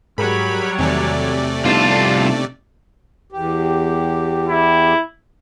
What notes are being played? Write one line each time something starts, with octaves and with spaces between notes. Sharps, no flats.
G#2 F#3 G3 G#4 A#4 C#5 B5
E2 C3 D#3 A3 D5 G#5
C2 B3 D4 D#4 F4 A5
E2 G4
E4